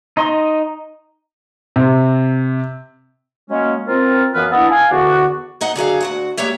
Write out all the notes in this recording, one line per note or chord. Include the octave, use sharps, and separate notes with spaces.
D#4 D#5 C6
C3
F#3 G#3 A#3 C#4
C4 F4 A#4
F#2 E3 B3 B4 F5 F6
B3 D4 E4 A4 D#5 F#5
F5 G#5
E2 D3 B3 D4 F#4
G#2 D#4 D#5 F#5
D3 F#3 G#4 F5
D2 F#4 F#5
G#3 A#3 G4 C#5 E5